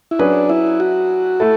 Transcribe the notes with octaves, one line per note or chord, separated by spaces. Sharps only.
E4
F#3 C#4 D4 G#4 B4
E4
F#4
A3 E4 A4